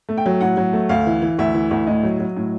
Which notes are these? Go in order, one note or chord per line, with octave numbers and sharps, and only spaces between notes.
A3
G5
F#3
A2 F#5
F#3
A3
D2 F5
E3
E3
D2 E5
E3
D2
A2 D#5
F#3
F#3
A2